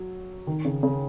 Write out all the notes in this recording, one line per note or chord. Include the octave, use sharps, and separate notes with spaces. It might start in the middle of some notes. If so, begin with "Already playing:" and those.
Already playing: F#3
D#3
C#3
C#3